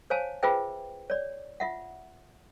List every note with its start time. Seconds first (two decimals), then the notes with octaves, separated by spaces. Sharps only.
0.10 C5 C#5 F5 G#5 A5
0.43 F4 G#4 B4 C5 E5 G5
1.10 C#5 D5
1.60 F4 E5 F#5